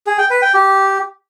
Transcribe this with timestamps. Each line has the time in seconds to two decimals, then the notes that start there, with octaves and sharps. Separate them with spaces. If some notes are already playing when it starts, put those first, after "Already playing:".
0.07 G#4
0.18 G5
0.30 B4
0.42 G5
0.54 G4